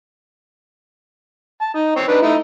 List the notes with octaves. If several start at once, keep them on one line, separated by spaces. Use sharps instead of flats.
A5
D#4
C4 C#5
D4 D#4 B4
A3 D#4 E4